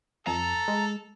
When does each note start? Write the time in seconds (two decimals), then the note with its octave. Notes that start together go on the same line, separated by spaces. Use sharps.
0.27 F2 A4 A#5
0.68 G#3